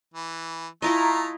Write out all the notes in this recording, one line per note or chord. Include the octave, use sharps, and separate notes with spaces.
E3
A3 E4 F4 D#5 A#5